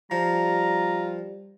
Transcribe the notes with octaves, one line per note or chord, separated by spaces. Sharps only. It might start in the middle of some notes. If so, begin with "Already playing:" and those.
F3 G3 F4 A#5